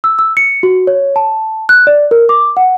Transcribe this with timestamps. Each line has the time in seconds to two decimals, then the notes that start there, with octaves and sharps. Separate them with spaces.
0.04 E6
0.19 E6
0.37 C#7
0.63 F#4
0.87 C#5
1.16 A5
1.69 F#6
1.87 D5
2.11 A#4
2.29 D6
2.57 F#5